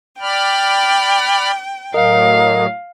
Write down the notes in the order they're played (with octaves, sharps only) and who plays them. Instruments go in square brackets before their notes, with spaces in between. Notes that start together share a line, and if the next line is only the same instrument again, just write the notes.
[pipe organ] D5 B5 F6 [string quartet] G5
[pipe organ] A2 F#3 [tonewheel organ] A#4 D#5 [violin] F5